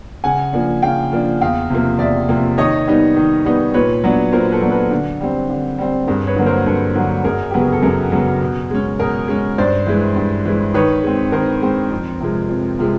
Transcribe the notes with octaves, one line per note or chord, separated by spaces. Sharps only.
C#3 F#5 G#5
F3 A#3 D4
C#3 F5 G5
F3 A#3 D4
E2 F5 G5
C3 F3 A#3
E2 D5 E5
C3 F3 A#3
D#3 C#5 D#5
G3 B3 D#4
D#3
G3 B3 D#4
A#2 B4 C#5
F#3 B3 D4
A#2 A#4 C5
A4 B4
F#3 B3 D4
A4 B4
D3
G3 C4
D3
G3 C4
G2 G#4 A#4
B4 C#5
D3 F#3 A#3
A#4 C5
G2 A4 B4
D3 F#3 A#3
F#2 G#4 A#4
C#3 F#3 B3 G4
G#4
A4
F#2 G#4 A#4
C#3 F#3 B3
B2
G#3 C#4
B2 G#4 A#4
G#3 C#4
G2 C5 D5
E3 G#3
G2
E3 G#3
D#3 B4 C#5
G#3 C4
D#3 A#4 C5
G#3 C4
F2
C3 F3 G#3
F2
C3 F3 G#3